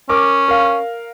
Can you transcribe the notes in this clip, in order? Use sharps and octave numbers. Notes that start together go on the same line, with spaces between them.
C#4 A#4 D6
A#4 F5